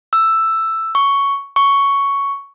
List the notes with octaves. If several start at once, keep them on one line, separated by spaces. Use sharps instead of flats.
E6
C#6
C#6